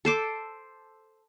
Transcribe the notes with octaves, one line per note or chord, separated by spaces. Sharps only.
A4 C5 D6